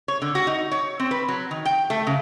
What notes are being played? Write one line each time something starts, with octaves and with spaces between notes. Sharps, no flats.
C#5
D3
F#4
D#4
C#5
C4
B4
F#3
D#3
G5
A3
C#3